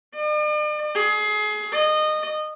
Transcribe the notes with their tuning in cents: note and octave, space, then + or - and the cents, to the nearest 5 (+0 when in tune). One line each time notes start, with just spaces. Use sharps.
D5 +45
G#4 +30
D#5 -20